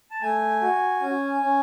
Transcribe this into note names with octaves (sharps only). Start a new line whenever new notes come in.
A5
A3 G#5
F#4
C#4
C#4